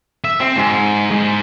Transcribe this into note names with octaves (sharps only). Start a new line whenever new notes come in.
E5
C4
G#2
G#2